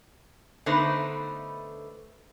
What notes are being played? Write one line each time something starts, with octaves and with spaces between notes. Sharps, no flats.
D3 A3 B3 D#4 B4 C5